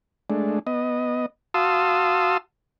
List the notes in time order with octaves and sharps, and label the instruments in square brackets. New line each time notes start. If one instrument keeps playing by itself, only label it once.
[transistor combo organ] G#3 A3 D4
B3 D#5
F#4 F5 A5 C6 D#6 E6